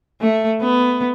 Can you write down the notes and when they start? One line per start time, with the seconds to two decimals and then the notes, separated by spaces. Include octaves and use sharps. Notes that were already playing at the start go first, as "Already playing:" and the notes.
0.21 A3
0.62 B3